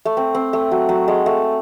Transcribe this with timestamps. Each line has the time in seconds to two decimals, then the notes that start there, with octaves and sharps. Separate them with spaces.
0.05 A3
0.17 C4
0.35 C4
0.53 A3
0.71 F#3
0.89 F#3
1.08 G#3
1.26 A3